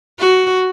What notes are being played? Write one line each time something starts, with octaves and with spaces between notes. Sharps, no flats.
F#4